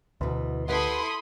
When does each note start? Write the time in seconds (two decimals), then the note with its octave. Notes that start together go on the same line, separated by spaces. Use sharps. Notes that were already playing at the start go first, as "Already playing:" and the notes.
0.21 D2 B2 E3
0.69 E4 G4 A4 B4 F#5 B5 C6 D#6